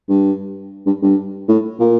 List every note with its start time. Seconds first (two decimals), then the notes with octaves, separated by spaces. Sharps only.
0.09 G2
0.86 G2
1.02 G2
1.48 A2
1.79 A#2